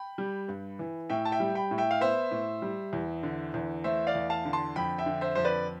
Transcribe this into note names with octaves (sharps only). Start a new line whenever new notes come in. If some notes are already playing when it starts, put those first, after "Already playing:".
Already playing: G5 B5
G3
G2
E3
A2 E5 G5
A5
E5 G5
G3
G5 B5
A2
E5 G5
F5
B3 C5 E5
A2
G3
E2
D3
E2
A3 C5 E5
D5 F5
E2
F5 A5
D3
A5 C6
F2 G5 B5
E5 G5
D3
C5 E5
F2 C5
B4 D5